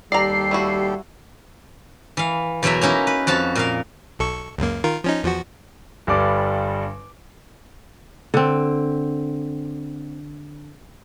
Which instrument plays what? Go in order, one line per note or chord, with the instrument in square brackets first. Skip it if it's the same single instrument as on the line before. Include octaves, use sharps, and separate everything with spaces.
[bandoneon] D#2 G4 A4 [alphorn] G3 [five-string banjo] D5 A#5 [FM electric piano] C7
[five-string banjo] A3 E4 F#4
[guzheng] E3 F5
E2 B2 F#3 A#4 E5
A#3 C#4 D#4 E4
B4
F2 F#4 F5 A5
A#2 A#4 F5
[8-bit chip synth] B1 A4 C#6
C#2 F#2 A#3
D#3 F4 A#4
F3 C#4 D#4
E2 F3 F#4
[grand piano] G1 G2 G3 D5 D6
[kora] D3 C4